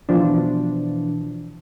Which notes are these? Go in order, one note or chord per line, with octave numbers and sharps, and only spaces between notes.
B2 E3 F3 D4